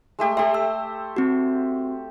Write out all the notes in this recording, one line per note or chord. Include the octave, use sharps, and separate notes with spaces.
G#3 A3 G4
G4 A4 E5 C6
E6
C4 F#4